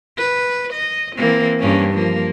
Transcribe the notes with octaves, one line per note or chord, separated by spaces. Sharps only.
B4
D#5
E3 A#3 C4
G2 A#3 C#4
F3 A#3